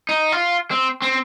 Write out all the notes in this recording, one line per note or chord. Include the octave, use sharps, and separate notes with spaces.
D#4
F4
C4
C4